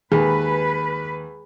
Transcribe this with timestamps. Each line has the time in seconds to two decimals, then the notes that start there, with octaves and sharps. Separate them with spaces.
0.12 D#2 G#4 B4